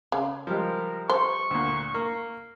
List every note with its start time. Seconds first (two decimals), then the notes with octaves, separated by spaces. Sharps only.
0.12 C#3
0.47 F3 G3 G#3 A#4
1.10 C5 C#6
1.51 D2 A#2
1.94 A#3